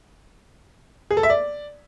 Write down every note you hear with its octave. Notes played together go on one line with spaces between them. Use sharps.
G#4
A4
E5
D5